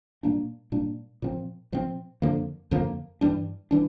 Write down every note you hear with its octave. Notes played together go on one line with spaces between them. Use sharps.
A#2 G3 A#3 D4
A#2 G3 A#3 D4
A#2 F3 C4
A#2 F3 C4
F2 D3 F3 A#3
F2 D3 F3 A#3
G2 E3 G3 D4
E3 G3 D4